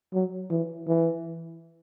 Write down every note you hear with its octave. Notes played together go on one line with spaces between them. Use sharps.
F#3
E3
E3